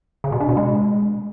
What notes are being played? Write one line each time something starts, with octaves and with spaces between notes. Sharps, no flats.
C#3
B2
D4
B2
G#3